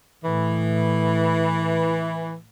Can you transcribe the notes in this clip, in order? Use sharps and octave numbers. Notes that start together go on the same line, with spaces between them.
A2 E3